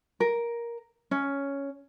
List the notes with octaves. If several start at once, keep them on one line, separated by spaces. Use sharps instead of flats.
A#4
C#4